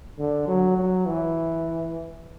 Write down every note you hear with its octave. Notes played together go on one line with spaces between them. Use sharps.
D3
F#3
F#3
E3